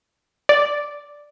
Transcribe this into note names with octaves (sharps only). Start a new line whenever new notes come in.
D5